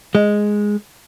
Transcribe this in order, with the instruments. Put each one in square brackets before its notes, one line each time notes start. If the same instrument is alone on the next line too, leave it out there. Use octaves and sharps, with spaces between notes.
[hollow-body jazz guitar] G#3